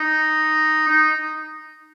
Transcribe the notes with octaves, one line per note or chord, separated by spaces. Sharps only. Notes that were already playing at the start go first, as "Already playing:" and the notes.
Already playing: D#4
D#4